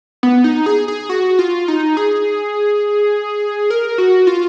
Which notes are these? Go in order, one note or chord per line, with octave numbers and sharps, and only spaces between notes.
B3
D#4
G#4
G#4
F#4
F4
D#4
G#4
A#4
F#4
F4